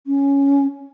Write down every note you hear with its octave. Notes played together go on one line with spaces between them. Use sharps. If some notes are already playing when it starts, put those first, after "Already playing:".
C#4